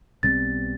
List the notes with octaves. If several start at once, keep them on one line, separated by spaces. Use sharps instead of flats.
B1 B2 G3 C4 A6